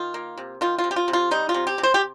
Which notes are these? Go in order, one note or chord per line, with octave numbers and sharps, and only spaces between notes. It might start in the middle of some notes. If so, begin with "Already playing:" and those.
Already playing: D#3 F4
A#3
C3
D#3 F4
F4
C3
G4
F4
C3
F4
G3 D#4
F4
C3
G4
C3
C5
G4